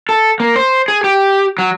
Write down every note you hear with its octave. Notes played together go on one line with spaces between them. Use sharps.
A4
A#3
C5
G#4
G4
F#3